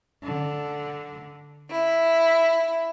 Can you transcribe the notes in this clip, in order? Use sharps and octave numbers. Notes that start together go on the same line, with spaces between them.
D3
E4